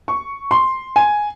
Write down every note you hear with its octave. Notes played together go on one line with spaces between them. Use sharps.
C#6
C6
G#5